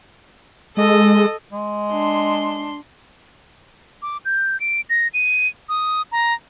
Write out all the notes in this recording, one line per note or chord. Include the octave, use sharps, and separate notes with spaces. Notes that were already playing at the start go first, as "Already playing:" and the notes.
G#3 A4 D#5
G#3
D4 C6
D6
G6
D7
A#6
D#7
D#6
A#5